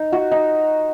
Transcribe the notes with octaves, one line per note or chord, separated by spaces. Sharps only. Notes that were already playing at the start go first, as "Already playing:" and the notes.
Already playing: D#4
F#4
D#4